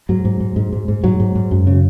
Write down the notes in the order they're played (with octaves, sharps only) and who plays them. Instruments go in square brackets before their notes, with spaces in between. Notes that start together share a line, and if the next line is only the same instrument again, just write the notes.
[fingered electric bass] G#2 F#3
G#2
G#2
G#2
G#2
G#2
G#2 F#3
G#2
G#2
F#2
C#3